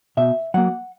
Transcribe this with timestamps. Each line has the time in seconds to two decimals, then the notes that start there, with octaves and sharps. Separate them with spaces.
0.17 B2 E5
0.54 F#3 A#3 F#5